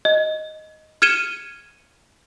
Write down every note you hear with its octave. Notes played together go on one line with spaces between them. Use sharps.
D#5
F6 G#6 C#7 D#7 E7 G7